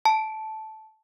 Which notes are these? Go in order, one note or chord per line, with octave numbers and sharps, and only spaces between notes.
A5 D7